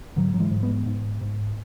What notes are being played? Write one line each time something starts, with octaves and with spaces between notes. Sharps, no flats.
G#2 D3 F#3
F#3
E3 G#3
G#2
G#3 B3
G#2
G#2